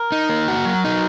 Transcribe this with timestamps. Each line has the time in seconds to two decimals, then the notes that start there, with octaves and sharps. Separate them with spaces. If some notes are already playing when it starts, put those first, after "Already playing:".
Already playing: A#4
0.12 D#4
0.29 A#3
0.48 F#4
0.65 F#3
0.84 D#4